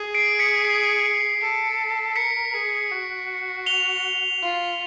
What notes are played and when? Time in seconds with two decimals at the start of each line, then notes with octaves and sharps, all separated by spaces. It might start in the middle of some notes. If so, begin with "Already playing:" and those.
Already playing: G#4
0.14 C7 D7
0.39 B6 C#7
0.65 C7
1.41 A4
2.16 A#4 B6 C#7
2.54 G#4
2.91 F#4
3.66 F7 G7
4.42 F4